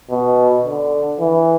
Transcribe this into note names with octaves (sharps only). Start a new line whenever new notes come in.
B2
D3
E3